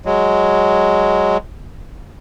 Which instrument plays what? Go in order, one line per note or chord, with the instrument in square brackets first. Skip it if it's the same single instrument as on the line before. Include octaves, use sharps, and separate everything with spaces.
[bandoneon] F#3 G#3